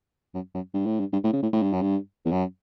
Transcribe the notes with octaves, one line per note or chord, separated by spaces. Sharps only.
F#2
F#2
G2
A2
G2
G2
A2
C#3
A2
A2
G2
F#2
G2
E2
F#2